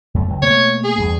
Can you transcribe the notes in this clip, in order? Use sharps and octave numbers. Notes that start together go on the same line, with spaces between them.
F#2 A3
C#2 D3 F#3
B2 A3 A#3 C#5
G#4
E2 G2